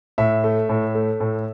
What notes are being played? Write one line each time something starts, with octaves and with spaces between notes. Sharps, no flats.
A2 E5
A3
A2
A3
A2